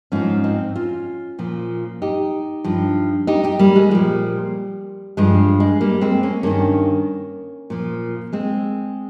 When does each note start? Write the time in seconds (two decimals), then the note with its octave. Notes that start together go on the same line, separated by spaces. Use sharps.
0.12 G#2 F3 C#4 F4
0.44 C4 D#4
0.75 C#4 F4
1.39 A#2 F3
2.02 D#4 G4
2.64 G2 F3
3.27 D#4 G4
3.44 D#4 G4
3.59 G3 A#3
3.76 G#3
3.91 A#2 F3 G3
5.17 G2 F3 G#3
5.60 G#3
5.81 G3 A#3
6.01 G#3 C4
6.23 A#3 C#4
6.43 G2 D#3 A#3 C#4
7.70 A#2 F3
8.33 G#3 C4